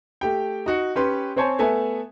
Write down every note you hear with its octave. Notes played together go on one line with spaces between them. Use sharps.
A3 G4 G5
D#4 F#4 C#7
C#4 G4 B4 G5 C6
C4 C5 C#5 G#5 A5
A3 B3 E5 G#5 A5